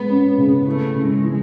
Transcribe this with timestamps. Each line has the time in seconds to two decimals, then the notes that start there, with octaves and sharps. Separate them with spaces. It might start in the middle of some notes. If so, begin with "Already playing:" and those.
Already playing: G#3 B3
0.09 C#4
0.38 C#3
0.67 A3 E4
0.95 C#3
1.09 G#3
1.24 E3